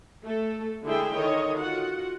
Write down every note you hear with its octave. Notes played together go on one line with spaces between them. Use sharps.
A3 A4
D3 G#3 E4 G#4 E5 G5
D3 D#3 C#5 D#5
F4 F#4 F#5